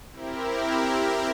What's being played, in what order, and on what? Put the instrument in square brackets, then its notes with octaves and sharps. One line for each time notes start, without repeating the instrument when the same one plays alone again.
[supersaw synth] C4 E4 G4 A#4